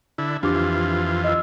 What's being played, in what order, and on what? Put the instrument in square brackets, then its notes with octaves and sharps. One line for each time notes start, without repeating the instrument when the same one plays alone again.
[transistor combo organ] D3 E4
[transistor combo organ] F2 E3 F4 [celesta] D4 G4 D6
[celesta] D#5 E6